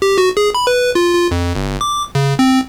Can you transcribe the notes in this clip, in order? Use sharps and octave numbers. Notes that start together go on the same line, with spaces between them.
G4
F#4
G#4
B5
B4
F4
F4
F2
G1
D6
C#3
C4